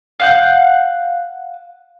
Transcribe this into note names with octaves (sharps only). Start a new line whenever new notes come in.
F5 F#5 G6